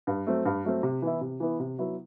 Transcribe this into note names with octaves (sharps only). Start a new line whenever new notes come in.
G2
F#3 A3 C4
G2
F#3 A3 C4
C3
E3 B3 E4
C3
E3 B3 E4
C3
F#3 B3 E4